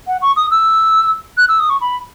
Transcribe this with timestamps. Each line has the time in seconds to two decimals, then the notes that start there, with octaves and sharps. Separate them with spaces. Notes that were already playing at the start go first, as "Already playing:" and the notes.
0.07 F#5
0.22 C#6
0.36 D#6
0.51 E6
1.37 F#6
1.49 E6
1.59 D#6
1.70 C#6
1.81 B5